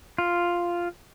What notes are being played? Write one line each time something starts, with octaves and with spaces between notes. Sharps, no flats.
F4